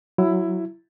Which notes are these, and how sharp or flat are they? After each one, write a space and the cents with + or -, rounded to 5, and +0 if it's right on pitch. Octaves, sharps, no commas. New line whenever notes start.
F#3 +0 E4 +15